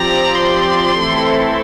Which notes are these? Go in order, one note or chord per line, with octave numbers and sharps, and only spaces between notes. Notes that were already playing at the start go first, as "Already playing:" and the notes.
Already playing: F3 C4 G4 D5 A#5
C6
E3 A3 C4 E4 A4